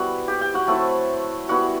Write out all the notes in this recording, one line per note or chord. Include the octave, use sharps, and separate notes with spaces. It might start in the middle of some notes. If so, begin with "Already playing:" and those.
Already playing: G3 B3 E4 F#4 F#5
G4 G5
G4 G5
F#4 F#5
F#3 A3 C4 E4 A4
G3 B3 E4 F#4 F#5